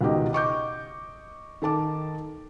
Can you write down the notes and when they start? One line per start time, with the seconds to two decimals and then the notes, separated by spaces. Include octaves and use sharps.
0.01 C#2 B2 D#3 G4 D#5
0.33 D#5 C#6 D6 G6
1.62 D#3 A4 A5 D6